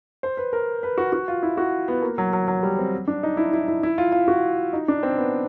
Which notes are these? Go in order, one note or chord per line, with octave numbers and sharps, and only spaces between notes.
C5
B4
A#4
B4
F#4
F#4
F4
E4
F#4
B3
A#3
F#3
F#3
F#3
G3
C4
D4
D#4
E4
E4
E4
E4
F4
F4
F#4
D#4
D4
C4
B3